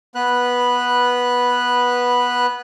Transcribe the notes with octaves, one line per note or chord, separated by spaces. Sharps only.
B3 B4 F#6